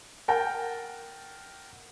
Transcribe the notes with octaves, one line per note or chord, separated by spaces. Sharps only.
A#4 F#5 G5 A5